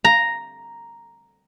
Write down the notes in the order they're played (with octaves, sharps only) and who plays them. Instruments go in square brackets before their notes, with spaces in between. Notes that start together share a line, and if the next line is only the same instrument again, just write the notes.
[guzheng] A#5